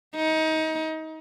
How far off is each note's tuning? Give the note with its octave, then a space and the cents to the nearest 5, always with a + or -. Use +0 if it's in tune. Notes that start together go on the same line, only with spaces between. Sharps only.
D#4 +25